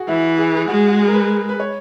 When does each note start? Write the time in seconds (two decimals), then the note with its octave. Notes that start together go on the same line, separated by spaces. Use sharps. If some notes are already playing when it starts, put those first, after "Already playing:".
Already playing: F#4 G#4
0.08 E3 E4
0.38 G#4
0.57 G#4
0.68 G#3 F#4
0.88 F#4
0.99 G#4
1.08 A#4
1.14 B4
1.49 B4
1.60 C#5